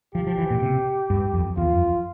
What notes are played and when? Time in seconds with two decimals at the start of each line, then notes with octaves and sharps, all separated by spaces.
0.15 F3 G4
0.27 F3
0.38 E3
0.50 A#2
0.62 C3
1.10 G2
1.34 F2
1.57 E2 F4
1.73 F2